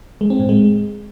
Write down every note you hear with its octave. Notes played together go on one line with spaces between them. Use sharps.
G#3
C4
A2
G#3